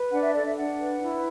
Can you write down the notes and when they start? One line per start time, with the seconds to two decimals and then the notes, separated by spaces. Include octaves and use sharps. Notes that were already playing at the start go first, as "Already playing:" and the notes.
Already playing: B4
0.11 D4 F#5
0.22 E5
0.34 A4 D5
0.46 E5
0.57 D4 F#5
0.80 B4
1.02 E4